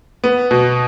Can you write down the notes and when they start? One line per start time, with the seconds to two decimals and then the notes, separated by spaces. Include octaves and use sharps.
0.24 B3
0.51 B2